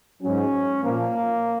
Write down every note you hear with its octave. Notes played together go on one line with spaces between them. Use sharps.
G#2 F#3 C#4
A#2 F3 A#3